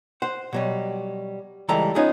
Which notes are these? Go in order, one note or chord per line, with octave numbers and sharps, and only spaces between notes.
C5 F#5
B2 F#3 G3
C#2 E3 G3 G#3 A4 A#5
B3 C#4 D#4 F4 G#4